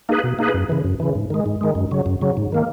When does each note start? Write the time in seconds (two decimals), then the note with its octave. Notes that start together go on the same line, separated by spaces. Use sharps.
0.09 A#3 D#4 G#4 B4
0.24 B2
0.39 A#3 D#4 G#4 B4
0.54 F#2
0.69 C#3 E3
0.84 F#2
1.00 C#3 E3
1.15 G#2
1.30 D#3 G#3
1.46 G#2
1.61 D#3 G#3
1.75 F#2
1.91 C#3 F#3
2.06 F#2
2.21 C#3 F#3
2.37 G#2
2.52 D#3 A#3